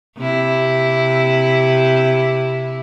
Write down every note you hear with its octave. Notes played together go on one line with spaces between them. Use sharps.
C3 E4